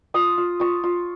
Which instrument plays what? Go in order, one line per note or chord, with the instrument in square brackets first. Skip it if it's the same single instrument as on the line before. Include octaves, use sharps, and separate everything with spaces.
[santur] F4 D#6
F4
F4 C#6
F4